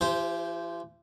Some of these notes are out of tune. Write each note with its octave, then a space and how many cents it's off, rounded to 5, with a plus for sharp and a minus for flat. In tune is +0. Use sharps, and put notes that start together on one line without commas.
E3 +45 G4 +0 C5 -10